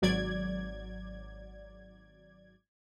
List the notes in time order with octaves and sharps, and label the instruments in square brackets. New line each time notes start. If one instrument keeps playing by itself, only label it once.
[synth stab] G#1 F#3 D5 G#6